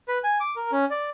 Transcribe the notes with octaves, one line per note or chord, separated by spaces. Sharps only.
B4
G#5
D6
A#4
C#4
D5